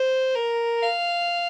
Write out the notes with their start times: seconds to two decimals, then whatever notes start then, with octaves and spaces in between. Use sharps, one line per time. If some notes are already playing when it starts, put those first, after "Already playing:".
Already playing: C5
0.35 A#4
0.83 F5